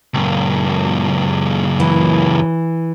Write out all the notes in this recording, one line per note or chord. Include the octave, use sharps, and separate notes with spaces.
C#2 F#2
E3